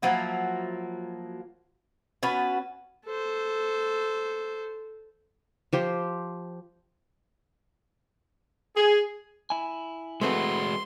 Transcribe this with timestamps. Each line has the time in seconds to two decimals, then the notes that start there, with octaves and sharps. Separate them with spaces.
0.02 F3 F#3 A#3 E4
2.23 B3 C#4 F#4 B4
3.06 A4 C5
5.73 F3 G4 C5
8.77 G#4
9.50 E4 G#5
10.21 G#3 A3 C4 F#4 B4 C6